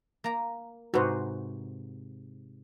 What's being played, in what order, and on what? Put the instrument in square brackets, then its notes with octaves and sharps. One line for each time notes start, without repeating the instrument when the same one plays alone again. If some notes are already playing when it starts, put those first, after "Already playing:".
[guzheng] A#3 A#5
[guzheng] G#2 C3 [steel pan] F#4 B4 C5